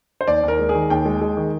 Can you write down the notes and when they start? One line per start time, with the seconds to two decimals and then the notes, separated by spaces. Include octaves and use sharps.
0.21 C5
0.27 D#2 D5
0.43 D#2
0.48 A#4
0.59 G#3
0.69 G#4
0.75 D#3
0.90 D#2 G5
1.06 G#3
1.21 G#3
1.37 D#3